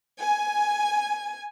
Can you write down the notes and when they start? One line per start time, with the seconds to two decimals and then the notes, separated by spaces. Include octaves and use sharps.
0.19 G#5